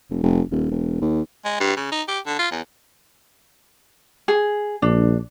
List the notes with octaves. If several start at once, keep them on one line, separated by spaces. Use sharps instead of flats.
F1
F1
D#1
E1
D#2
G#3
G2
C#3
D#4
G4
D3
F4
E2
G#4
A#1 D4